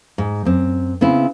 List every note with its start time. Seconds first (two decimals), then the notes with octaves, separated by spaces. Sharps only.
0.18 G#2
0.45 F#2 C4
1.01 C#3 B3 C4 E4